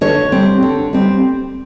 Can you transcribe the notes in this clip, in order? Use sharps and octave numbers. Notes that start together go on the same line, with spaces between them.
D3 C#5
G3 C4
D3
G3 C4